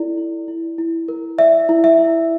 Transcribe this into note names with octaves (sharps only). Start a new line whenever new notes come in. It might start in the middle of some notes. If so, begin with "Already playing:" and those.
Already playing: E4 A4 D5
E4
E4
E4
A#4
D5 E5
E4
E5
E4